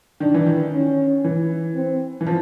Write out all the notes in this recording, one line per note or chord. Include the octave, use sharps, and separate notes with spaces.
D#3 D4
E3
D#3
C#4
E3
C4
E3
F3